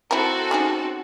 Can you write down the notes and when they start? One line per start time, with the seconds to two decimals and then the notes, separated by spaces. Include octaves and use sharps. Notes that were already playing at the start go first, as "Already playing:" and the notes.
0.11 C4 E4 F#4 A4 A#4
0.51 C#4 D#4 G#4